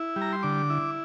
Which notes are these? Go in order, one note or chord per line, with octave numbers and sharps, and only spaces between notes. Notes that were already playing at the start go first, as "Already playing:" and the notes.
Already playing: E4
G3
A#5
C6
D3 D6
E4